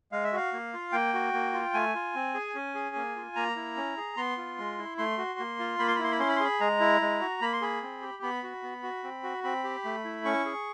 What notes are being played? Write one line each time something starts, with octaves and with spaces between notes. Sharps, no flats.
G#3 F5
E5
F#4 F5
A#3
F4
A#3 G5
F#4
A#3
F4
A3 G#5
F4
C4
G#4
C#4
G#4
A#3
F4
A#3 A#5
E4
C#4
G#4
B3 C6
F4
G#3
E4
A3 C6
F#4
A#3
F4
A#3 B5
C6
B5
E4 C6
B5
C#4 C6
B5
C6
G#4 B5
G#3 A#5
E4
G#3
F#4
A#3 B5
C6
G#4 B5
C4
G4
B3 B5
F#4
B3
F#4
C4
F#4
C4 B5
G4
A3
E4
C#4 C#6
G#4